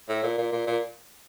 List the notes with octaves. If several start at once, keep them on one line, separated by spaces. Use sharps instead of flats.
A2
A#2
A#2
A#2
A#2